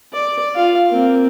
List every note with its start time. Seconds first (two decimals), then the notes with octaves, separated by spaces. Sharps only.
0.13 D5
0.55 F4 F5
0.90 A#3 C4